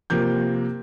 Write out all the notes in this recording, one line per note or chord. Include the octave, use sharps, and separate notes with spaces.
C3 F3 A#3 G6